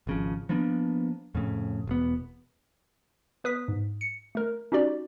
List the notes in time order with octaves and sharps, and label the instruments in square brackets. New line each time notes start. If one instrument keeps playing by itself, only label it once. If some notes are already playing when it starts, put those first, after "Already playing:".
[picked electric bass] G#1 C#3 F3
F3 A#3 B3 D4
F2 A2 C#3
E1 B3
[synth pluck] B3 B4 D#6 B6
G#2
C#7
A3 A#4
C#4 D#4 F#4 G4 D5